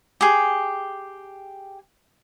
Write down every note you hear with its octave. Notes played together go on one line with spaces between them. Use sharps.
G4 G#4